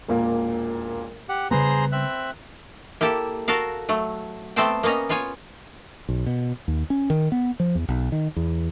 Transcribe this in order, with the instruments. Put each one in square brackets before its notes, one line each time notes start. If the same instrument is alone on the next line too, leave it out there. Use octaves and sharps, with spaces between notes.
[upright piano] E1 A#2 A#3
[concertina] G4 F#5
[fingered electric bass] C#3 G3 B3 [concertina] G#4 C5 A#5 [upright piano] B4
[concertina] C4 E5 F#6
[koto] A#3 E4 G4 A4
F#4 A4 A#4 F5
F#3 A3
A3 B3 C4 A4 C5 G5
A#3 B3 C#4 D#5 A#5
B3 F4 C#5 G#5
[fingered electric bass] B1
B2
D#2
C#4
D#3
B3
F3
E2
B1
D#3
E2